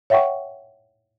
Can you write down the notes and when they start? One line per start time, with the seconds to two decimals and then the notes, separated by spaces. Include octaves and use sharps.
0.10 C#5 E5 F#5 G5 C#6